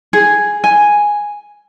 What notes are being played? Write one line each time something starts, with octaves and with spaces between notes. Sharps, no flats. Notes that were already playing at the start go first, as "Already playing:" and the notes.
G#4
G#5